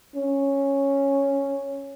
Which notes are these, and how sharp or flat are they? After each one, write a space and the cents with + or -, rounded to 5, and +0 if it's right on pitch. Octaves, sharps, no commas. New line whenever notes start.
C#4 -5